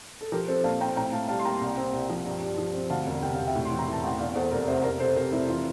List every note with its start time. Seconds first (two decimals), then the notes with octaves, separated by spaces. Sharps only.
0.21 A4
0.32 F3 G4 A#4
0.48 C4 A4 C5
0.64 A#1 F5 A5
0.80 C4 G5 A#5
0.96 A2 G5 A#5
1.12 A2 F5 A5
1.28 G3 F5 A5
1.39 C6
1.45 A#3 G5 A#5
1.61 C2
1.77 C4
1.93 C2
2.10 F3
2.25 G2
2.42 G2
2.58 F3
2.74 C4
2.90 D2 F5 A5
3.07 E1
3.22 C3 G5
3.35 E1 F5
3.47 E5 G5
3.55 A2
3.65 C6
3.71 E3
3.79 A#5
3.87 E3
3.93 A5
4.03 A1 G5
4.19 E2 D5 F5
4.35 E2 A4 C5
4.51 F1 A#4 D5
4.68 C3 C5 E5
4.84 F1 A#4 D5
5.00 C3 A4 C5
5.16 C3 G4 A#4
5.32 F1 E4
5.48 E3 F4